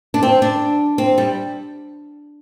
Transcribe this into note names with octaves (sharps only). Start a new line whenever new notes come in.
D4
C4
D4
C4
G3